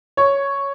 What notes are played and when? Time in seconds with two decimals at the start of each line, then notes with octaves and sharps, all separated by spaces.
0.17 C#5